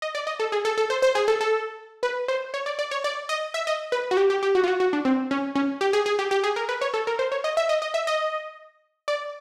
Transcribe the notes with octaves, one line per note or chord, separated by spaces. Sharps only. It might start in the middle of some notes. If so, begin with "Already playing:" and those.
D#5
D5
D#5
A4
G#4
A4
A4
C5
C5
G#4
A4
A4
B4
C5
C#5
D5
D5
C#5
D5
D#5
E5
D#5
B4
F#4
G4
G4
G4
F#4
F4
F#4
F#4
D4
C4
C#4
C#4
G4
G#4
G#4
G4
G4
G#4
A#4
B4
C#5
A4
A#4
C5
C#5
D#5
E5
D#5
D#5
E5
D#5
D5